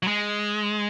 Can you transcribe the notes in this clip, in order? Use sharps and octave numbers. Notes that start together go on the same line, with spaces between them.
F#3
G#3